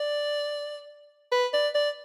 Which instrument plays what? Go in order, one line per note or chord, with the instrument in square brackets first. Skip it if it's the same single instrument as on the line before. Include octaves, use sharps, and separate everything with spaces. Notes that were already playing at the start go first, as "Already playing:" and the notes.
Already playing: [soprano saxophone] D5
B4
D5
D5